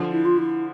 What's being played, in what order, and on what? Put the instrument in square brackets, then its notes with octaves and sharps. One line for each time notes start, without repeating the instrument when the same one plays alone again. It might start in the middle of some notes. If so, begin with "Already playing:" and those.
Already playing: [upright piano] D3 F3
[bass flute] E4
F4
E4